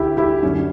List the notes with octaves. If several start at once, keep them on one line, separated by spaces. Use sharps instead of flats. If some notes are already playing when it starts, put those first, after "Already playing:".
Already playing: D2 D3 E4 G4
E4 G4
F#2 D3 C#4